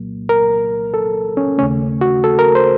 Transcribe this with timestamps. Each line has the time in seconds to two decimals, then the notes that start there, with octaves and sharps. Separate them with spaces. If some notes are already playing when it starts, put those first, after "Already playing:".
Already playing: C2 A#2 F#3 A#3
0.29 A#4
0.94 A4
1.37 C#4
1.58 D#2 C#3 A3 C#4
2.01 F#4
2.24 A4
2.39 A#4
2.55 C5